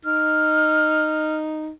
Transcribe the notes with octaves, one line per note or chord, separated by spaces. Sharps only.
D#4 F6